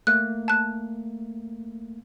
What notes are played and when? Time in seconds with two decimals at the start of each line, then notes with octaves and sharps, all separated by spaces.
0.07 A3 A#3 F#6
0.48 A5 F#6